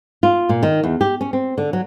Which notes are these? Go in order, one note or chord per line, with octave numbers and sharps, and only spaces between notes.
F4
A#2
D#3
E2
G4
C#4
C4
D3
F#3